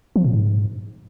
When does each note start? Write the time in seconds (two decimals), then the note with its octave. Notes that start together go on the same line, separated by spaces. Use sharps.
0.16 F3
0.24 A#2
0.33 G#2